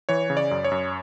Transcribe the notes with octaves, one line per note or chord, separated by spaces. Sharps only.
E3 C#5
C#3
D5
F#2
C#5
F#2